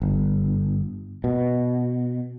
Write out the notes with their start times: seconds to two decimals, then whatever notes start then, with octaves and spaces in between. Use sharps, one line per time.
0.02 G1
1.24 B2